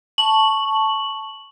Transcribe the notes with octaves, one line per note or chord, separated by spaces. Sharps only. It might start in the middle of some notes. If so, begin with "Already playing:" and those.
A5 C#6 F#7